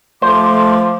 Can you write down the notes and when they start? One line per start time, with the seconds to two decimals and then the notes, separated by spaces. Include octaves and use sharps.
0.22 F3 A3 C5 C6 D6